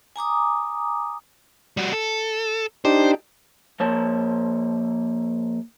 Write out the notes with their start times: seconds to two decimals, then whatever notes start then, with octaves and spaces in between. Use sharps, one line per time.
0.16 G#5 A#5 D6 D#6
1.77 G3 F#4
1.93 A4
2.85 D4 D#4 G4 C5
3.80 F3 A#3 C5 C#5 A5